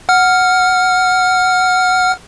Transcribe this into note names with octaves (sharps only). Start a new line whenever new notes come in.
F#5 F6